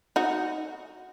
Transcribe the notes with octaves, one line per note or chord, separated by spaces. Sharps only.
D#4 F#4